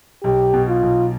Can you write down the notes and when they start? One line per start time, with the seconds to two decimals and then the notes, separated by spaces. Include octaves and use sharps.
0.23 B1 G4
0.54 B2
0.68 F4
0.83 B1